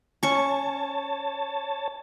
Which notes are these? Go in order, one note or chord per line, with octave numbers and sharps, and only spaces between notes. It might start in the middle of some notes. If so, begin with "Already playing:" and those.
C#4 C#5 A5 C#6